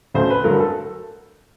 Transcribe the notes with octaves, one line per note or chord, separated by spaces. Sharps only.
D2 C#3 F#3 A3 C5
B4
G2 D3 F#3 A3 A#4
A4